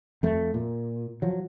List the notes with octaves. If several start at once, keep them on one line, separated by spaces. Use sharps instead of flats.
F2 A3
A#2
F3 F#3